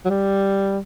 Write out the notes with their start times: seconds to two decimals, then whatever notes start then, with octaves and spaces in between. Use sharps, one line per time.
0.05 F#3
0.10 G3